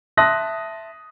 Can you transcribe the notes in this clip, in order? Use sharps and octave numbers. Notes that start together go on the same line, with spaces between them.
E5 A5 C6 D#6 F#6 A#6